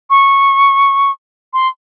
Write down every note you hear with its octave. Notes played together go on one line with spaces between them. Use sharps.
C#6
C6